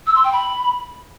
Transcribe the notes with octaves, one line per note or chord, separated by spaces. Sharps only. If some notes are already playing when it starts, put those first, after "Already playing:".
E6
C6
G5
B5